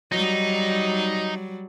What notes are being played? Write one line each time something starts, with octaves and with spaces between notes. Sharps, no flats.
F#3 G3 D#4